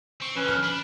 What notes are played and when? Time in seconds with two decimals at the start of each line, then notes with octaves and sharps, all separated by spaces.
0.22 C4 C#6
0.36 F2 D3 C#4 B4
0.48 F6
0.63 D4 B5